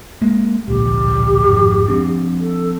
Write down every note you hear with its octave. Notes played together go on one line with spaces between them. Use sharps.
G#3 A#3
D1 A#1 G4
G#1 F2
F3 C4 D4
A4